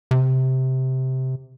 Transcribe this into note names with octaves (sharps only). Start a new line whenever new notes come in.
C3